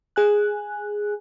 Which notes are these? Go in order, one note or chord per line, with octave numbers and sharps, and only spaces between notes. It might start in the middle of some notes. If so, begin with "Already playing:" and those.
G#4 G#5 F#6